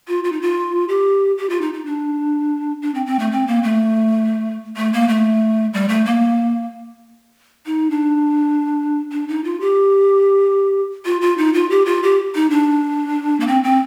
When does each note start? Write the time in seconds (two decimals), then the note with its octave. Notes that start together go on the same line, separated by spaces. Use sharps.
0.08 F4
0.24 F4
0.32 D#4
0.42 F4
0.89 G4
1.38 G4
1.50 F4
1.61 D#4
1.74 D#4
1.86 D4
2.82 D4
2.95 C4
3.06 C4
3.19 A3
3.32 C4
3.47 A#3
3.63 A3
4.77 A3
4.93 A#3
5.08 A3
5.74 G3
5.89 A3
6.05 A#3
7.66 D#4
7.91 D4
9.12 D4
9.28 D#4
9.44 F4
9.61 G4
11.05 F4
11.21 F4
11.38 D#4
11.54 F4
11.70 G4
11.86 F4
12.03 G4
12.35 D#4
12.50 D4
13.40 A#3
13.47 C4
13.64 C4